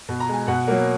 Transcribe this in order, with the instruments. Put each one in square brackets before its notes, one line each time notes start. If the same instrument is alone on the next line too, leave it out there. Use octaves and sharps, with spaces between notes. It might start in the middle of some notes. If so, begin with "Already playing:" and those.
[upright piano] B2
A#5
G#3 G#5
B2 F#5
F#3 A#3